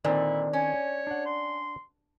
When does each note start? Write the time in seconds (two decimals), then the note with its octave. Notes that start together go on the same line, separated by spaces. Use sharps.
0.04 A#2 D3 D#3 C4 E4 D5
0.53 C#4 C#5
1.07 D4 F#5
1.25 C6